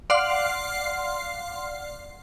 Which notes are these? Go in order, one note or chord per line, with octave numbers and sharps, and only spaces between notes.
D5 F5 F#5 C6 F6 C7